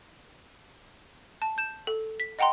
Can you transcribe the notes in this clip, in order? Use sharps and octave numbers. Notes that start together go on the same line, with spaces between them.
A5
G6 E7
A4
B6
D#5 F#5 G5 A#5 C6